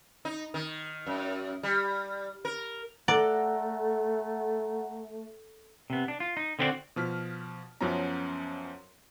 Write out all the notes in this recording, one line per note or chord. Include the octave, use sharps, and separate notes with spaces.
D#4
D#3
F#2
G3
A#4
A3 A4 D5 F#5 A#5
C3 B3
D4
F4
D#4
D3 B3 C4 E4 F#4 D5
B2 F3 F6 B6
F#2 F3 F#3 B3 C#4 A#5